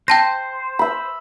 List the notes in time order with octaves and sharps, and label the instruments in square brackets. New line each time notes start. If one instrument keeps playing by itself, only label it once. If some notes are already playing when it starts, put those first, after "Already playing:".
[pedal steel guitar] C5 [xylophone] G5 A5 A#6
[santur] E5 B5